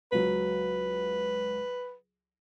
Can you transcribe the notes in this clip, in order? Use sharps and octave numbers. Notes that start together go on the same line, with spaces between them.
C#2 F#3 B4